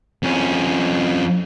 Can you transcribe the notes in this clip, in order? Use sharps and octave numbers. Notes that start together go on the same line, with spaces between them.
F2 C#4